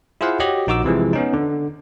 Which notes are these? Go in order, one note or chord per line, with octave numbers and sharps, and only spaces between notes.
E4 F4 G#4 C5 F5 F#5
F#4 G4 C#5 D#5
A#1 D#4 F#4 D6 E6
C3 E3 F3 G#3
B3 C#4 D#4
D3